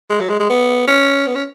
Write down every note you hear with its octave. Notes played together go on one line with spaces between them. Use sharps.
G#3
F#3
G#3
G#3
B3
C#4
B3
C#4